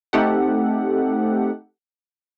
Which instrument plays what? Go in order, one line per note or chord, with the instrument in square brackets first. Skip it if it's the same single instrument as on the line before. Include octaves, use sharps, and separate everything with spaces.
[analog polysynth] A3 C4 D#4 G4 A4 F#5